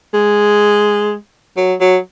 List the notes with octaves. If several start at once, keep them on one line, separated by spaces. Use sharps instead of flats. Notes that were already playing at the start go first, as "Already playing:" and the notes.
G#3
F#3
F#3